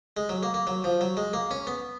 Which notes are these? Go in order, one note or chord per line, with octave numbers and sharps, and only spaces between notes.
G#3
F#3
A#3
A#3
F#3
F3
F#3
G#3
A#3
C#4
B3